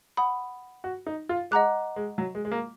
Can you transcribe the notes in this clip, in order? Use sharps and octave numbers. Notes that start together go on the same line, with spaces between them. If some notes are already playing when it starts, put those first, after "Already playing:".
F#5 B5 D#6
F#4
D#4
F4
G#3 D#5 F#5 A#5 D6 F#6
G#3
F#3
G#3
G#3
A#3